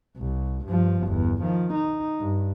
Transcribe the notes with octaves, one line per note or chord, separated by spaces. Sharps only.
C2
G2 F3
G1 E2
D#3 F3
D#4
G2